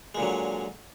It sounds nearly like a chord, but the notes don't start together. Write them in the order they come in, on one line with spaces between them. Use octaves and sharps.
G#3 A#2 D3 F#3